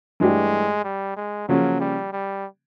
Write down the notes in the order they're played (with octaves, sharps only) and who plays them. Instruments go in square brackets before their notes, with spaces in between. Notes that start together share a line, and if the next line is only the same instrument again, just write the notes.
[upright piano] G2 E3 A3 D4 G4 [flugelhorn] G#3
[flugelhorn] G3
G#3
[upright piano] C#3 F3 A#3 C#4 [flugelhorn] F#3
[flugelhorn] G3
G3